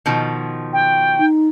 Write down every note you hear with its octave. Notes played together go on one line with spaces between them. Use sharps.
B2 D#3 F3
G5
D#4